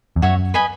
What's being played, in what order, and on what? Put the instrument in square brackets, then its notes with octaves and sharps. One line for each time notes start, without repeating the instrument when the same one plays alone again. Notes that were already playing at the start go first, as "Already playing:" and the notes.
[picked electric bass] E2
[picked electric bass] F#2 [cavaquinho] F#4 C#5 E5
[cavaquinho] B4 D#5 G#5 B5